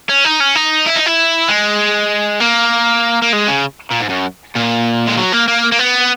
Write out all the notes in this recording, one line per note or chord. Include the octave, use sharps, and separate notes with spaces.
C#4
D#4
C#4
D#4
E4
D#4
E4
G#3
A#3
A#3
G#3
C#3
A#2
G#2
F#2
A#2
G#3
F#3
A#3
A#3
A#3
B3